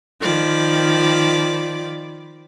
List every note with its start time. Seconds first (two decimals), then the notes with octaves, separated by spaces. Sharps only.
0.20 D#3 F3 D5 B5